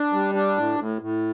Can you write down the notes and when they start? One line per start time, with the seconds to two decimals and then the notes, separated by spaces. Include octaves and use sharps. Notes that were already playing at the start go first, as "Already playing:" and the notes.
Already playing: D4
0.13 G3
0.35 D4
0.57 A2
0.79 A2
1.02 A2